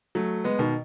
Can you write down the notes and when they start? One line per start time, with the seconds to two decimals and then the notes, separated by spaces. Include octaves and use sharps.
0.15 F#3 A3
0.44 G#3 B3
0.59 B2 D#3